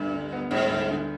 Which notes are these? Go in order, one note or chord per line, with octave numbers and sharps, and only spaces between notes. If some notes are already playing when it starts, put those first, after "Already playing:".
Already playing: D2 G2 G3 B3
D3
B3
G#2 G3
D2
D3